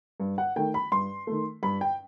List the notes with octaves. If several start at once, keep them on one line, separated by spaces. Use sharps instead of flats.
G2
F#5
D#3 A3 G5
B5
G2 C6
D#3 A3
G2 B5
G5